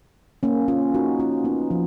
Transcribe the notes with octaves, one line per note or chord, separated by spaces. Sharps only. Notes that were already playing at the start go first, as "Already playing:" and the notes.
A#3 C#4
C#4 F4
D#4 F#4
C#4 F4
B3 D#4
F3